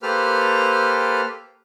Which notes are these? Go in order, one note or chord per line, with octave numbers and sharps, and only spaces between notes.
A#3 G4 A4 B4 C5 F6